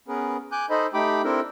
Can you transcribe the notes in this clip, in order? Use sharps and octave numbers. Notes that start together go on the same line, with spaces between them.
B3 C#4 G#4 A#4 B4
G#5 D6 F#6 G6
D#4 A4 C5 D#5 B5
A3 D#4 G4 G5 B5 D6
C4 D4 E4 A4 A#4